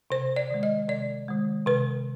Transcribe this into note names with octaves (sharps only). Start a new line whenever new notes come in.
C3 C5
D5
D#3 G#3
D#5
C3 D5
D#3 G#3
C3 B4